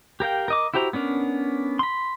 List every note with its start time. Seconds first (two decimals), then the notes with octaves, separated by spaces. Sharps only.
0.20 G4 A#4 F5 G5
0.48 A#4 D#5 D6
0.74 E4 F#4 G4 C5 A#5
0.93 B3 C#4 D4 A#4
1.79 B5 C6